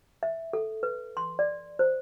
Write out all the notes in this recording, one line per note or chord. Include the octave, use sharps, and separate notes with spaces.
E5
A4
B4
C6
D5
C5